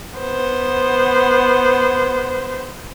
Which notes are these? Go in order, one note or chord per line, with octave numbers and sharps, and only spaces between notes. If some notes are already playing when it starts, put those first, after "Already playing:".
B3 C5